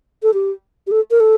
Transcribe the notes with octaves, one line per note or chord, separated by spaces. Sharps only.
A4
G4
G4
A4
A#4
A4